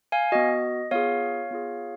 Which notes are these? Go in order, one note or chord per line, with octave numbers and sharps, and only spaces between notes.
F5 G#5
B3 F#4 D#5
B3 F4 G#4 C#5 F5
B3 F4 G#4